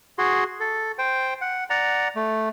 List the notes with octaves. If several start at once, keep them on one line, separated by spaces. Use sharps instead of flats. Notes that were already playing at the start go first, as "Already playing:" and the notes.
F#4 G#4 C6
A4
C5 G5
F#5
D5 F#5 A#5
A3